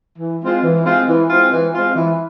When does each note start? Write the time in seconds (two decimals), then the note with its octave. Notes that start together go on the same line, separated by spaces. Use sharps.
0.19 E3
0.41 G#3 C4 F4
0.63 E3
0.84 G#3 C4 F4
1.06 E3
1.29 G#3 C4 F4
1.51 E3
1.74 G#3 C4 F4
1.95 E3